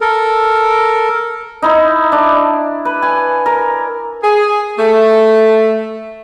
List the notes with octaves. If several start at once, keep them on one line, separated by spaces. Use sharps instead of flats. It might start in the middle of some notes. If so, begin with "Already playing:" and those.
A4 A#4
D#4 E4
D4
B4
G#5
A#4
G#4
A3